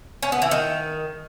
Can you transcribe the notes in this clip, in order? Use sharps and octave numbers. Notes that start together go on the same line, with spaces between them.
C#4
B3
E3
D#3